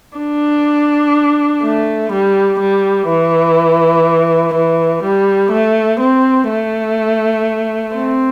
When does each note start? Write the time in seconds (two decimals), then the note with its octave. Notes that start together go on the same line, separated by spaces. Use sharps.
0.17 D4
1.63 A3
2.12 G3
2.60 G3
3.09 E3
4.54 E3
5.03 G3
5.52 A3
6.00 C4
6.49 A3
7.96 C4